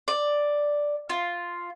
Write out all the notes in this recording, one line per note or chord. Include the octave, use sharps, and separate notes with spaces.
D5
F4